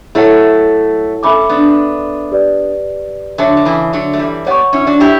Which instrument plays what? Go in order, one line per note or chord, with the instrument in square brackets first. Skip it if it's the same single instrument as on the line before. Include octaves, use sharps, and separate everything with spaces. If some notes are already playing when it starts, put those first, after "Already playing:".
[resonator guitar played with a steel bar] F#3 A3 [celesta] E4 A4 C#5 F#5 A5
[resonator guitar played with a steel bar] A3 C#4 [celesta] A4 E5 B5 D6
[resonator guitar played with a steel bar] B3 D4
[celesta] G4 B4 D5
[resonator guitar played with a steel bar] D3 F#3 [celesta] C#5 E5 A5
[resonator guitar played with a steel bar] F#3
C#3 E3
D3 F#3
A3
E3 G3
[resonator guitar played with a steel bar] G3 B3 [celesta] C#5 F#5 C#6
[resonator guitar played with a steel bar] C#4 E4
D4 F#4
E4 G4